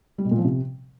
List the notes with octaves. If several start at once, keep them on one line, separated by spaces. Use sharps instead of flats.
G3
B2
A#2
F3
C3